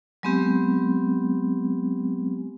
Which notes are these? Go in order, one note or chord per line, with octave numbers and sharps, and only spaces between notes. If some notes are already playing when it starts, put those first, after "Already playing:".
F#3 G#3 B3 C4 G4